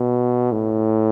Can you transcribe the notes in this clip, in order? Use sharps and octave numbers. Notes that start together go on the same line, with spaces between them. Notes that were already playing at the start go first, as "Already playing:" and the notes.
Already playing: B2
A2